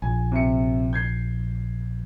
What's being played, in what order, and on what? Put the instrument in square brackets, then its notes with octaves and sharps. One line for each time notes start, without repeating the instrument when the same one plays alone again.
[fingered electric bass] A#1 [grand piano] G#5
[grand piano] C3 E5 C#7
G6 G#6 C7